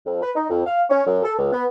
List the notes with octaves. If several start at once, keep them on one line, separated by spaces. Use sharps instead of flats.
F2
B4
D#4
F2
F5
C#4
F#2
A4
C#2
B3